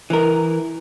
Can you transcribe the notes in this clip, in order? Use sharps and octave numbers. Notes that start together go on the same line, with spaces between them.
E3 A#4